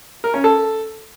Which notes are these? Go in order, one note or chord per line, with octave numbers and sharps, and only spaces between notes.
A#4
C#4
A4